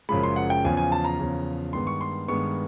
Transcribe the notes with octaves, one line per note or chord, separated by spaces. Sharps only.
F#1 F#2 C#3 F3 G#3 B5
C6
F#5
G5
E2 C#3 F3 G#5
G#5
A5
A#5
E2 C#3 F3
G2 D#3 G#3 B3 C6
C#6
C6
G2 D#3 G#3 B3 C#6